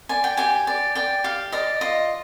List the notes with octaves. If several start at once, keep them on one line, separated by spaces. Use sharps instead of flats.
D5 G#5
G5
G4 G#5
D5
D5 G5
G4 F5
D5 D#5
F4 D#5